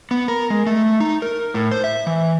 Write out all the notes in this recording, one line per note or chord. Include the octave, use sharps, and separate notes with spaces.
B3
A#4
G#3
A3
D#4
A#4
A2
C5
E5
E3